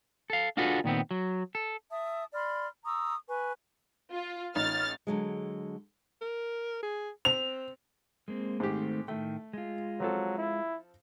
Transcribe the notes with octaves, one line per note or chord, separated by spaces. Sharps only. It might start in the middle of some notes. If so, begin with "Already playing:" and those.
A4 F5
D4 F4 F#4 G#4 A4 B4
A#2 D#3 B3 C4
F#3
A4
E5 A5 D#6
D5 B5 C6 F6
A#5 C#6 D#6 E6
B4 G#5 C#6
F4
A1 D#4 F6 A6
D3 F#3 G#3
A#4
G#4
C4 F7
G#3 A#3 C4
G#2 D#3 A3 C4 G4
A2 D#3 A3 G5
G#3 F4
F3 F#3 C4 A4
E4